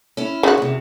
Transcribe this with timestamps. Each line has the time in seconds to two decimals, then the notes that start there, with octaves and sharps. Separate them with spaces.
0.17 C#4 E4
0.43 C#3 F#4
0.58 E2 C3